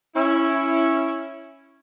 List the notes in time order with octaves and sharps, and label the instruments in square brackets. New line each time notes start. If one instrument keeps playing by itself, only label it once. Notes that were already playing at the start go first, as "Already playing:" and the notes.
[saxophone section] C#4 E4